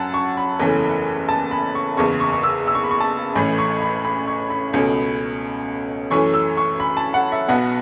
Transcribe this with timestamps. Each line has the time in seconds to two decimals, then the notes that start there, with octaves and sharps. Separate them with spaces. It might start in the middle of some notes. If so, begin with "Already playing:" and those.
Already playing: F#2 F#3 C#4 F#5 A5
0.14 C#6
0.37 B5
0.59 F#1 E2 E3 A3 C#4
1.29 A5
1.51 B5
1.75 C#6
1.97 F#1 E2 C#3 C#6
2.20 C#6
2.33 C#6
2.43 E6
2.67 E6
2.75 C#6
2.84 B5
2.91 C#6
3.00 A5
3.35 A1 A2 E3 A3 C#4 B5
3.58 C#6
3.82 B5
4.05 B5
4.27 C#6
4.50 B5
4.73 C#2 B2 A3 C#4
6.10 F#2 E3 A3 C#4 C#6
6.34 E6
6.57 C#6
6.80 B5
6.97 A5
7.14 F#5
7.32 E5
7.49 B1 B2 B3 F#5